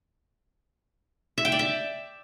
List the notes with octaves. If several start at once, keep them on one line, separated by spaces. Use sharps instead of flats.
E5
G5
D5
E5